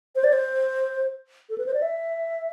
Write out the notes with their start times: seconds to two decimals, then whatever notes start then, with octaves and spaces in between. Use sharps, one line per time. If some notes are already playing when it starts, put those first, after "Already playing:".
0.16 C5
0.24 D5
0.33 C5
1.50 A4
1.58 B4
1.66 C5
1.74 D5
1.82 E5